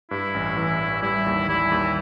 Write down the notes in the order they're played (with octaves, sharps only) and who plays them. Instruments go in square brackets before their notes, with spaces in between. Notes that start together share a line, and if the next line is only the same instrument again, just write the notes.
[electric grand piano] G2 [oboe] E4
[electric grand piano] A1
E3
A1
[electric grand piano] G3 [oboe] E4
[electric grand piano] D#2
[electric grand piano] G3 [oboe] E4
[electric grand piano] D#2